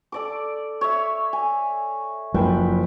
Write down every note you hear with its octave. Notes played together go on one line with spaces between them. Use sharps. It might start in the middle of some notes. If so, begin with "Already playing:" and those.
A4 D5 D6
C#5 E5
G#5
F#1 F3 B4 G5